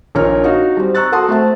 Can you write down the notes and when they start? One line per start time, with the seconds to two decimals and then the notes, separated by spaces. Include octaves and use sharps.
0.15 A#1 A#2 D#4 A#4 C#5 F6
0.44 D#4 F#4 F5
0.77 G3 C4
0.95 A#5 C#6 E6 F#6 A6
1.12 F#4 A4 F#5 A5 C6 D#6
1.28 A3 C4 E5 A5